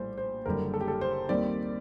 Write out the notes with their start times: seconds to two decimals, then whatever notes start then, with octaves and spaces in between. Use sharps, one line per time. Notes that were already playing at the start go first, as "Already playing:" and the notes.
Already playing: A#1 A2 G3 C5
0.18 C5
0.46 F#1 F#2 D3 G3 A#4
0.74 A4
0.81 G4
0.88 A4
1.01 C5
1.29 D#2 D#3 G3 C4 D5